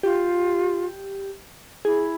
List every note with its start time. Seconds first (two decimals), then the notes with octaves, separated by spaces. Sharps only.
0.03 F4 G4
1.85 E4 G#4